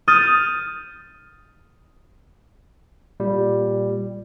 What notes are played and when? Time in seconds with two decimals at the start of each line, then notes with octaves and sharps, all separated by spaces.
0.08 D#6 F6 G6 A6
3.20 A#2 G3